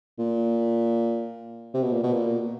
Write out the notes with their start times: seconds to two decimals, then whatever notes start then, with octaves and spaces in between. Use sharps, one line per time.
0.19 A#2
1.74 C3
1.83 B2
1.93 A#2
2.03 B2
2.13 A#2